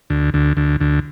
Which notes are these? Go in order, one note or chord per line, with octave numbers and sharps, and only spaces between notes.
D2
D2
D2
D2